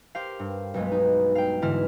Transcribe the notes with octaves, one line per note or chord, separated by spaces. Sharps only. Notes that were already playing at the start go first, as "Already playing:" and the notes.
G4 A#4 C5 F5
G2
B1 G2 G#3 B3
D#4
F5 G5
G#2 D3 E3 E4 F6